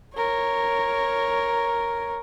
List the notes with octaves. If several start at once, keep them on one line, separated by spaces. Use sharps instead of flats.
A#4 C#5